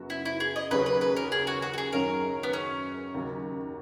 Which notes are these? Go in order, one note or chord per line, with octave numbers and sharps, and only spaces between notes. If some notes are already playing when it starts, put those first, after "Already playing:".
Already playing: F#2 C#3 F#3 B3 F#4
E4
E4
G#4
D#5
D#2 C#3 F#3 C#4 G#4 B4
B4
B4
A#4
G#4
F#4
F#4
F#4
G#4
F#2 D#3 F#3 C#4 G#4 A#4
B3
C#4
D#2 C#3 F#3